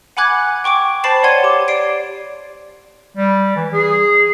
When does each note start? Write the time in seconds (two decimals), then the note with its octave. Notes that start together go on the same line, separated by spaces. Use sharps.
0.17 F#5 G#5 B5 D6 F#6 G#6
0.64 G5 C#6 D6 D7
1.04 C5 A5 B5 A6 C7 E7
1.23 C#5 D5 F#5 C6 G#6 D#7
1.43 G4 D6
1.68 D5 C7 D7
3.16 G3
3.56 E3
3.73 G#4